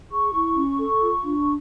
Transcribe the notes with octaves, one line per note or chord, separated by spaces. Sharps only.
G#4 C#6
E4
C#4
A4
F4
D4